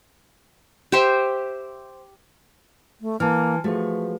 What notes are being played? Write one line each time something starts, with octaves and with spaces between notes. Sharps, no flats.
G4 C5 E5
A3
E3 A#3 A5 F6
F3 A3 F#4 G#4 B4